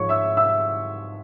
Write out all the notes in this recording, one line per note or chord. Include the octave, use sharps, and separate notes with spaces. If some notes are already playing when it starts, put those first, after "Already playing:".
Already playing: G#2 F3 G#3 C#5 C#6
E5 E6
E5 E6